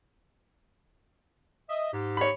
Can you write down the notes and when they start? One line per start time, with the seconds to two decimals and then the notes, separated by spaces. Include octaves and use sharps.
1.69 D#5 E5
1.93 G#2 G4
2.17 C#5 B5